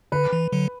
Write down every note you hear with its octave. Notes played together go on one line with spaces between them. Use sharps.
D3 B4
E3
D3 F#3